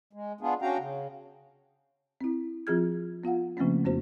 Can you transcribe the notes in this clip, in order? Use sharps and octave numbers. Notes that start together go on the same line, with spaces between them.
G#3
B3 D4 F4 G#4
C#4 D4 F#4 F5 G5 A#5
C#3
C4 E4
F3 C4 F4 G#4 F6 G#6
B3 F4 F5 F#5
C#3 F3 A3 A#3 C4 C#4
F2 B3 F#4 C5